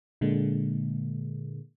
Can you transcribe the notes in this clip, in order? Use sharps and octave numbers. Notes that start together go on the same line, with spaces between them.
A#2 D3 G#3 A#3